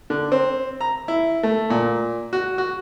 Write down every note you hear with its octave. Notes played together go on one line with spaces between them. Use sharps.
D3
C4
A#5
E4
A3
A#2
F#4
F#4